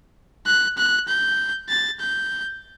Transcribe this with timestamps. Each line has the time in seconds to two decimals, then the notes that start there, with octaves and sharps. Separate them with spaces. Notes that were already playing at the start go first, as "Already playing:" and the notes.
0.47 F#6
0.78 F#6
1.08 G6
1.70 A6
2.00 G6